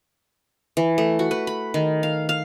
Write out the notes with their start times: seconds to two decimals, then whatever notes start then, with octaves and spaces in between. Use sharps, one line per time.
0.77 E3
0.98 A3
1.19 F#4
1.31 B4
1.47 B5
1.74 D#3
2.03 F5
2.29 F5